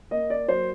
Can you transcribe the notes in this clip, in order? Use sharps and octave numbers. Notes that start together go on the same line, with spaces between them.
A#3 D#5
D5
F#3 C5